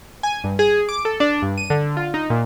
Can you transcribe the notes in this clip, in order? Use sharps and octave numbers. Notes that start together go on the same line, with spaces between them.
G#5
G2
G#4
D6
A4
D4
G2
D#7
D3
F4
D#4
A#2